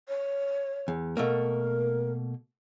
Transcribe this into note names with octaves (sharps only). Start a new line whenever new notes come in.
C#5
E2
B2 A3 A#3 A#4